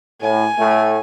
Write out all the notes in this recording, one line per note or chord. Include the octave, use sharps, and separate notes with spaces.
A2 G#5
A2 A3